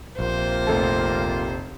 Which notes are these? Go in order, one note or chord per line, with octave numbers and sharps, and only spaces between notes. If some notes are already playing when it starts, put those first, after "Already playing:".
A#1 C3 A#3 F4 C5
F1 A4 A5